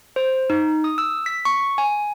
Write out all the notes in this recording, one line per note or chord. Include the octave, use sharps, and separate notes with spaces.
C5
D#4
D#6
E6
B6
C#6
G#5